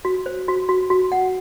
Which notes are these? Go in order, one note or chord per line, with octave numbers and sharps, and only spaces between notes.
F#4
C5
F#4
F#4
F#4
F#5